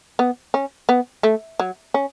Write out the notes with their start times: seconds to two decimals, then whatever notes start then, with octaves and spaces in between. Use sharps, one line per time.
0.19 B3
0.54 C#4
0.89 B3
1.23 A3
1.60 F#3
1.94 C#4